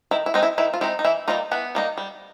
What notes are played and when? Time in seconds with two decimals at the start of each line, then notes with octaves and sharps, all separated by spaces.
0.11 D#3 E4
0.26 E4
0.34 G#3 C4 D#4
0.43 E4
0.58 D#3 E4
0.74 F4
0.81 G#3 C4 D#4 E4
0.99 D#4
1.04 E3 E4
1.28 F3 G3 A#3 D#4 F4
1.51 E3 B3 B4
1.75 G3 A#3 D#4
1.98 G3